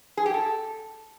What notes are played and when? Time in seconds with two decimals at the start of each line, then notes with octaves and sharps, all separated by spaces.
0.17 G#4
0.26 G4
0.34 A4